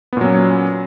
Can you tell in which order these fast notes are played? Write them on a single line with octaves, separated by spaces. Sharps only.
B3 A#2 F#3 C#4